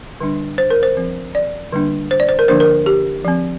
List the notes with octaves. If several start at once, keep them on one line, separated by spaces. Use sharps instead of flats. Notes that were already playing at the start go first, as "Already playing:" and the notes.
D3 G3 D4
C5
A#4
C5
F3 C4
D5
D3 G3 A#3 D4
C5
D5
C5
A#4
D3 F3 A#3 D4 C5
A#4
G4
F3 C4